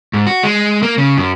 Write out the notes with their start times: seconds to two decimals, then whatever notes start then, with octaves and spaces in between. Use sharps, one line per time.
0.13 G#2
0.27 F#4
0.43 G#3
0.83 A#3
0.98 C#3
1.18 F#2